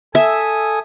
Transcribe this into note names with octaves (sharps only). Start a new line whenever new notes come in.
A4 E5 G#5 D#6